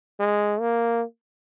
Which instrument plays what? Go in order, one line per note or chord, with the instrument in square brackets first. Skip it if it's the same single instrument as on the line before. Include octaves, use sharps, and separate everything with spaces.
[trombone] G#3
A#3